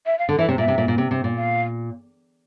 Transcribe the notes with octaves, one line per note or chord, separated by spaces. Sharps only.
E5
F5
D3
E3 E5
C3
A#2 E5
C3
A#2
A#2
C3
C3
A#2
F5